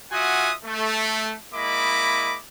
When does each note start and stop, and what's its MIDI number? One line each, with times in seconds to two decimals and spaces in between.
0.12 0.52 65
0.12 0.52 66
0.12 0.52 76
0.12 0.52 78
0.12 0.52 80
0.12 0.52 87
0.65 1.34 57
1.54 2.37 56
1.54 2.37 58
1.54 2.37 64
1.54 2.37 75
1.54 2.37 83
1.54 2.37 86